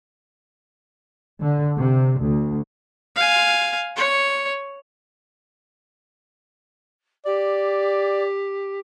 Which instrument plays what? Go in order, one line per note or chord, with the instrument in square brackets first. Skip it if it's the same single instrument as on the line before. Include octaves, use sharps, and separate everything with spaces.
[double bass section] D3
C3
D2
[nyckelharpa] F5 G#5
C#5
[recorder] G4 [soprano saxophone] D5